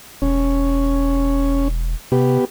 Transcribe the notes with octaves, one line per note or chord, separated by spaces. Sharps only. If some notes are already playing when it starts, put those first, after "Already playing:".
E1 C#4
C3 B3 G4